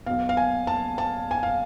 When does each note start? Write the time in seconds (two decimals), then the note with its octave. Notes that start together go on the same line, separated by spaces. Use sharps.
0.06 B1 B2 F5
0.29 F5
0.37 G#5
0.67 A5
0.98 A5
1.31 G#5
1.43 F5